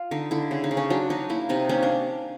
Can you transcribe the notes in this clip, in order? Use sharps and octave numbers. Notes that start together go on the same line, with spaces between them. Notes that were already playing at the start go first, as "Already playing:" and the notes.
Already playing: F4
D3 D#4
D3 E4
C#3
D#4
C#3
C#4
F#3 D4
F#3 D#4
A#3 E4
C3 D#4
A#3 C#4
D4